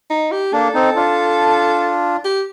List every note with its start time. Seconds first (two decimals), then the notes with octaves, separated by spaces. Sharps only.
0.10 D#4
0.32 G4
0.53 A#3 D4 A4
0.74 C4 D#4
0.96 D4 F4
2.25 G4